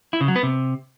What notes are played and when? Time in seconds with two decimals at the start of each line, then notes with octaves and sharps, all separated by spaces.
0.13 E4
0.21 C#3
0.28 F#3
0.36 B3
0.43 C3